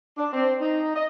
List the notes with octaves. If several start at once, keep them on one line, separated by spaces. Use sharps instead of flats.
D4
C4
D#4
D#5